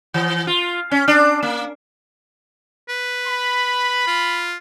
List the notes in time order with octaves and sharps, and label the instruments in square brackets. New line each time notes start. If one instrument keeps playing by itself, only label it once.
[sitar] E3
F4
C#4
D4
A#3
[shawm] B4
[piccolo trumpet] B5
[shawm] F4